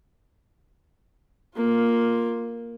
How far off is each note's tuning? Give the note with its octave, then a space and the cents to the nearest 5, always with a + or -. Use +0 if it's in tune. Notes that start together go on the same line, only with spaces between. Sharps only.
A#3 +0 F4 +10